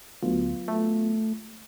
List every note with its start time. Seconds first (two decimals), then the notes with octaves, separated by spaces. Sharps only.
0.23 D2 F#3 B3 F4
0.68 A3